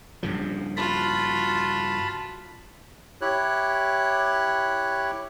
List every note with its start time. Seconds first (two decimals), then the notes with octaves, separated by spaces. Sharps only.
0.23 G2 C#3 F3
0.77 F4 F#4 A5 B5
3.21 E4 G4 C#5 F#6